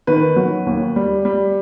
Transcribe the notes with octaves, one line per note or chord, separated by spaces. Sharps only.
D#3 B4
F#3
D#2
G3
G3